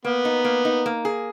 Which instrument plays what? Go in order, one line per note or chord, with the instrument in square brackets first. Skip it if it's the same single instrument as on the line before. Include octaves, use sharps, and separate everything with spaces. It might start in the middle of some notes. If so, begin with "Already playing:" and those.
[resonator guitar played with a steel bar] A#3 [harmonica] B3
[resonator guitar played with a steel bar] D#4
A#3
D#4
A#3
G#4